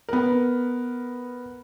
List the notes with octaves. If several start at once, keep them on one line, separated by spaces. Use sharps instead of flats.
B3 A#4